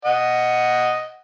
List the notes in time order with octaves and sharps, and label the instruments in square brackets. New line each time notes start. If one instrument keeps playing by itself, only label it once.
[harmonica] D#5 F#5